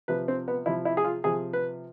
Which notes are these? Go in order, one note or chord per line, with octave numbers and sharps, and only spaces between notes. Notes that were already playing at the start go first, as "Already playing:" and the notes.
C3 F3 B4
C4
B3
C3 F3 E4
E4
G#4
F4
C3 F3 G#4
B4